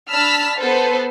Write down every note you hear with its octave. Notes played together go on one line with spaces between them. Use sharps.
D4 A5 B5 E6 F6 B6
B3 A4 B4 C5